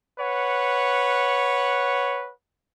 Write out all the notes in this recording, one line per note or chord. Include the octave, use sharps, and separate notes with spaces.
B4 C#5 F#5